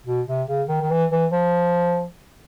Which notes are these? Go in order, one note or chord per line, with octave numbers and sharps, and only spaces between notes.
B2
C3
C#3
D#3
D#3
E3
E3
F3